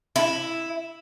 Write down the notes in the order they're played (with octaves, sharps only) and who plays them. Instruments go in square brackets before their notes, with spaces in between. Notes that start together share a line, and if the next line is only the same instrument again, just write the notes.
[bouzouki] E4